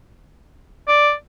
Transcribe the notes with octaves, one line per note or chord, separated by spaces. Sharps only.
D5